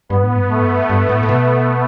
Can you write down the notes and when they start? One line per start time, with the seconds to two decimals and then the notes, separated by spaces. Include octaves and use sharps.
0.09 G2 B3
0.23 A2
0.35 G2
0.48 A2 A3
0.60 G2
0.90 G2
1.09 A2
1.23 A2
1.29 B2